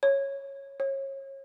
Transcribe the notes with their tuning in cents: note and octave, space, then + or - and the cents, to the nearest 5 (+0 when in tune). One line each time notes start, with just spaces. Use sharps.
C#5 -10
C#5 -30